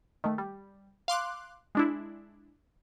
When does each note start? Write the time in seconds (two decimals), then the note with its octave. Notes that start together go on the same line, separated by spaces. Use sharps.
0.24 D#3 A3
0.38 G3
1.08 F5 C6 D6 F#6
1.75 G#3 D4 E4